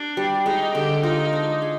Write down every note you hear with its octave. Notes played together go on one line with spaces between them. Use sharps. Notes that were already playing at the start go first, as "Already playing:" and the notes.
Already playing: D4 G4
G3
G#3 D#4
D3 G4
D#4 F4
D4
G#4